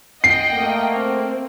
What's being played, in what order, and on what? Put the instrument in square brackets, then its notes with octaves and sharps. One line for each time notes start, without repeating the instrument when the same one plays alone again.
[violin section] D#5 F#5 G5 [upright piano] C7
[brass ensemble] A3 A#3
[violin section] C4